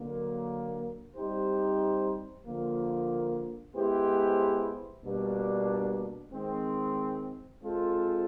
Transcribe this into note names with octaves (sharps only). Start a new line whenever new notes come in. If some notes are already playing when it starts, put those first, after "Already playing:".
Already playing: D3 F#3 A#3
G3 C4 D#4 G4 C5
D3 F3 A#3
G#3 B3 E4 G4 C5
B2 G3 A#3 D4
D#3 G#3 C4
G#3 C4 F4 A4 C5